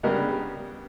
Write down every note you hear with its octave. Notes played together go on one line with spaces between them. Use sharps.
C#3 G3 B3 D4 A#4